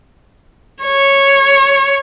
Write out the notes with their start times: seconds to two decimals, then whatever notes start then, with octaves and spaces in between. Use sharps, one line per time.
0.84 C#5